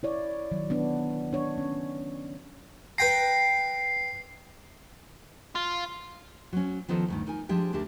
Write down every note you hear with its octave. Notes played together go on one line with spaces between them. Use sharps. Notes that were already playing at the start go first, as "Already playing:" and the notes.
E4 C#5 D5
D#3 F#3
B3 D4
D4 C#5
C#4
B4 G5 A#5 C7
F4
F#3 C#4
D#3 F3 B3 D#4 A4
D2 G2 D#3
D#4 A#4 G#5
F3 G#3 D4 G4
D2 D4 G4 A#4